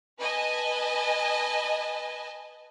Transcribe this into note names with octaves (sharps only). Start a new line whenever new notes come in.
B4 D#5 G#5 A5